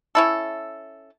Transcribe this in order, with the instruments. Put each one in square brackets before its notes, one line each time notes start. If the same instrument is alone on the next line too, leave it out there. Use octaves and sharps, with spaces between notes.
[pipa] C#4 E4 A4